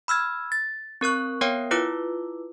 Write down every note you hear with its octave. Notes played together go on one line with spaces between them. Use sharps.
B5 E6 F6 G#6
A6
C4 A#4 C#6 F#6
B3 A#4 C#5 F5 G5
E4 F4 B4 D6